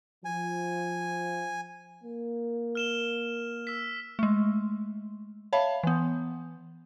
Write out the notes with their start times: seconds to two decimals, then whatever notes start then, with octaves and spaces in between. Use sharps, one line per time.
0.25 F3 G#5
2.04 A#3
2.75 F6 E7 G7
3.67 E6 B6
4.19 G#3 A3
5.53 C#5 E5 F5 A5 B5
5.83 E3 B3